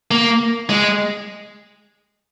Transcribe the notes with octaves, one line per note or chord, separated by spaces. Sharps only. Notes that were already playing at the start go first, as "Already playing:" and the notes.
A#3
G#3